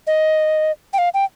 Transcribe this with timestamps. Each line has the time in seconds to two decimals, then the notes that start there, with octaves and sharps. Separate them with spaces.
0.07 D#5
0.93 G5
0.98 F5
1.14 G5